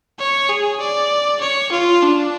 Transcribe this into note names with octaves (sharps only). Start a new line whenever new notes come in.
C#5
G#4
D5
C#5
F4
D4